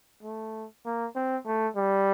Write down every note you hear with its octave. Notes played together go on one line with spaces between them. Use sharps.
A3
A#3
C4
A3
G3